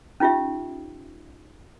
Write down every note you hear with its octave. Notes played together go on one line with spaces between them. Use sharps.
C#4 D#4 F4 G4 E5